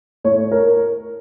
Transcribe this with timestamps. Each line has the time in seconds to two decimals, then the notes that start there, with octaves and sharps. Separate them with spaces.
0.24 A2 C#5
0.52 A#4